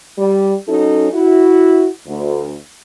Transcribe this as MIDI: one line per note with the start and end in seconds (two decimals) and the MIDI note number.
0.18 0.54 55
0.68 1.08 54
0.68 1.08 61
0.68 1.08 63
0.68 1.08 66
0.68 1.08 69
1.13 1.88 64
1.13 1.88 66
2.07 2.55 38